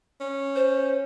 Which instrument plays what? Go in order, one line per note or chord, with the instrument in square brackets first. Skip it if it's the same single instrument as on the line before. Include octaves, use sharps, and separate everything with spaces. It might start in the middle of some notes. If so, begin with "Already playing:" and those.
[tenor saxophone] C#4
[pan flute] C5